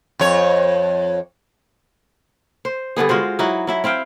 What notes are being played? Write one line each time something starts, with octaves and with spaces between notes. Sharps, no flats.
F2 C#5
C5
G2 D3 B3 G#4
G#3 F4 F#4 C5
F#3 D#4 E4 F#4
F#3 E4 E5
C4 E4 F5 G5